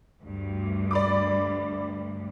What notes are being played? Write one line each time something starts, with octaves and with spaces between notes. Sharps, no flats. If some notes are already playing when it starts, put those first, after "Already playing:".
D2 G2
D5 B5 D6